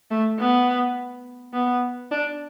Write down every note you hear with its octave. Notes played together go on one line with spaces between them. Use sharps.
A3
B3
B3
D4